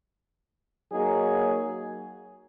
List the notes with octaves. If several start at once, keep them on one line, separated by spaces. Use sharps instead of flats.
F#3 A#3 D#4 G#4